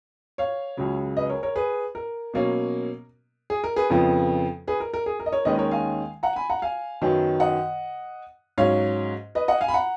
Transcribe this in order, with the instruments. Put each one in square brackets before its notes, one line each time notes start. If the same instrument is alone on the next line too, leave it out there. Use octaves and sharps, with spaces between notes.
[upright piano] C#5 F5
C#2 C#3 F#3
B4 D#5
A#4 C#5
A#4 C#5
G#4 B4
A#4
B2 F#3 A#3 C#4
G#4
A#4
G#4 B4
F2 C#3 F3 B3
G#4 B4
A#4
A#4
G#4
A#4
D#5
A#4 C#5
D#2 D#3 G#3 C#4 B4 D#5
A#4 C#5
F5 G#5
F#5 A#5
G#5 B5
F#5 A#5
F5 G#5
F#2 D#3 F#3 B3
D#5 F#5
G#2 F#3 C#4 C#5 F5
B4 D#5
D#5 F#5
F5 G#5
B5
F#5 A#5